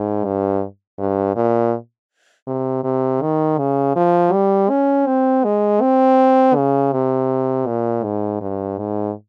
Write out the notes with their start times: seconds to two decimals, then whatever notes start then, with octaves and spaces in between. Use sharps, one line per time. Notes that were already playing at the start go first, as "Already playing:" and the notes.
Already playing: G#2
0.25 G2
0.98 G2
1.36 A#2
2.47 C3
2.84 C3
3.22 D#3
3.58 C#3
3.96 F3
4.33 G3
4.70 C#4
5.07 C4
5.44 G#3
5.81 C4
6.56 C#3
6.92 C3
7.66 A#2
8.04 G#2
8.41 G2
8.78 G#2